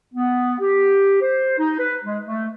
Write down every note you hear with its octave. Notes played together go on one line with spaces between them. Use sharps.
B3
G4
C5
D#4
B4
G#3
A3